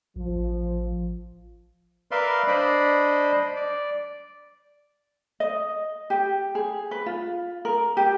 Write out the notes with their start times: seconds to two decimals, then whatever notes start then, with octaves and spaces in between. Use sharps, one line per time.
0.16 A1 F3
2.11 A#4 B4 D5 E5 F5 C6
2.48 D4 C5 D5 D#5 B5
3.56 D5
5.40 D#5
6.10 G4
6.55 G#4
6.91 B4
7.06 F4
7.65 A#4
7.97 G4